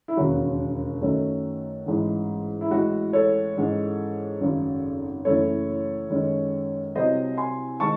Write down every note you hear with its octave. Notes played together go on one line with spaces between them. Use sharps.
E4
E1 D#2 C#3 F#3 F#4
F#2 D#3 F#3 A3 C#4
A1 G#2 E3 G#3
E4
A1 A2 E3 G#3 F#4
A4 C#5
G#2 E3 G#3 C#4
G#1 F#2 C#3 F#3
F#1 F#2 E3 A3 A4 C#5
F#2 D#3 G#3 C#4
C2 C3 F#3 C4 C5 D#5
G#5 C6
D#3 G#3 C4 A5 C#6